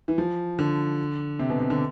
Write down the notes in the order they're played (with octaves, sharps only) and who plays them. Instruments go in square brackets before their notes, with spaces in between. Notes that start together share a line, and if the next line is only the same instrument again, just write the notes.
[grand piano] E3
F3
D3
C3
B2
C3
D3